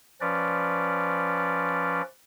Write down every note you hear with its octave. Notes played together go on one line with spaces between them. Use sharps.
F3 C#4 B4 D5